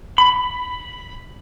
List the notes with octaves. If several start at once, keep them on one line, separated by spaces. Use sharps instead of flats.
B5